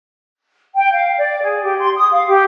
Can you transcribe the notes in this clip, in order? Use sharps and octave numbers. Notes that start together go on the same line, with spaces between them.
G5
F5
D5
G#4
G4
C6
D#6
F5
G4